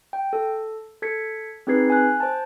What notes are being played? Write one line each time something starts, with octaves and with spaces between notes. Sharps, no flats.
G5
A4
A4 G#6 B6 C#7
C4 D#4 G#4 B4 G#6 C7
G#5 F#6
C5 A5